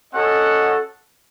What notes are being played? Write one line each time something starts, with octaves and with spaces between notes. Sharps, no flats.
C#4 F#4 A4 D#5 F#5